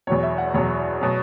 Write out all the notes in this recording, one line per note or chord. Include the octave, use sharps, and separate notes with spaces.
E2 B2 F#3 C#5
E5
F#5
E2 B2 F#3 C#5
B2 F#3 C#5